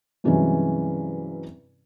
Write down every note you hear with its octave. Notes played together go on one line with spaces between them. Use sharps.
G2 C3 E3 F#3 G#3 C#4